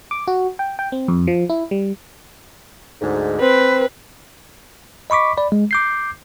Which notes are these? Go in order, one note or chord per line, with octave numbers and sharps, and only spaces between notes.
D6
F#4
G5
G5
C4
F2
F3
E4
G3
D2 G#2
C4 B4
D#5 B5 C#6 D6 B6
D5 B5
G#3
D6 G6 C7